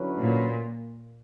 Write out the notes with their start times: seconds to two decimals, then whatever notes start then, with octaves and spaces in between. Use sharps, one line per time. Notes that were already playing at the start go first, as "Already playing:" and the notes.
Already playing: D3 F#3 C#4 E4 B4
0.19 A#2